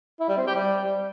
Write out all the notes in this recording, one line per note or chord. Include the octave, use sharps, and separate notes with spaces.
E4
G3
C4
G4
G3